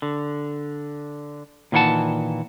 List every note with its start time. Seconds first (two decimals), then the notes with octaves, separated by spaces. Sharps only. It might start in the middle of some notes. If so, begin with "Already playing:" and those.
0.02 D3
1.72 A#2 D#3 E3 A#4 F#5 A5